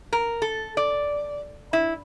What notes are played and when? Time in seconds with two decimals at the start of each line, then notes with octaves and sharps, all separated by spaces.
0.13 A#4
0.42 A4
0.77 D5
1.73 E4